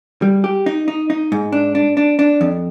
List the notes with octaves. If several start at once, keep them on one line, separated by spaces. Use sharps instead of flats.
G3
G4
D#4
D#4
D#4
G#2
D4
D4
D4
D4
F2